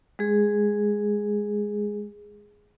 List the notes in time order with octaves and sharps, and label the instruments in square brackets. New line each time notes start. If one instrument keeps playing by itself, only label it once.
[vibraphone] G#3 G#4